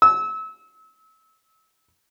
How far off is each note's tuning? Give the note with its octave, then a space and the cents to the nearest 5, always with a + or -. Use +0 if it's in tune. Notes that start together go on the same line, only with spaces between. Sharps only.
E6 -30